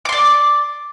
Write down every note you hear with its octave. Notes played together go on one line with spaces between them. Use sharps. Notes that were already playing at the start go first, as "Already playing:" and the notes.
D5 C6 D6